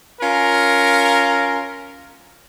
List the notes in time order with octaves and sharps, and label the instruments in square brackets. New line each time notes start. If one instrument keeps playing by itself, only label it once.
[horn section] C#4 F4 A#4